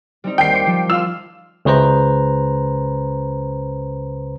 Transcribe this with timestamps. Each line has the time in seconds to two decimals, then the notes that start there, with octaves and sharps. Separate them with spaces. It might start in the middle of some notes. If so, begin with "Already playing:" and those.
0.24 G3 C4 D#4
0.38 D#2 G5 C7
0.53 C5 D6 C#7
0.66 F3
0.90 F4 F5 C6 E6
1.65 C#2 C#3 B4 C5 A#5